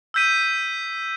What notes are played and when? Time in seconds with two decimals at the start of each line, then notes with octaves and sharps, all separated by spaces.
0.14 E6 G6 B6 D#7